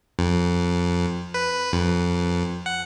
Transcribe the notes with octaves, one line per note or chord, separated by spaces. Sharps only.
F2
B4
F2
F#5